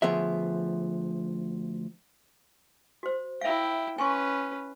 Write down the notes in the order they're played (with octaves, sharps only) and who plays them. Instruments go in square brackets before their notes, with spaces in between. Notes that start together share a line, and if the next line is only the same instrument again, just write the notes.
[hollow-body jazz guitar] D2 F3 B3 G#4 E5
[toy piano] F#4 C5
[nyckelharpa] E4 G5 [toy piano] E5 F5
[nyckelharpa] C#4 B4 [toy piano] G#5 C6 C#6